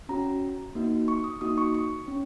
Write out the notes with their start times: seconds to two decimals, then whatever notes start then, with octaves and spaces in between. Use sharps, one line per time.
0.09 C#4 F#4 A#5
0.75 A#3 D#4 F#4
1.08 C#6
1.24 D#6
1.41 A#3 D#4 F#4 D#6
1.58 C#6
1.74 C#6
2.08 C#4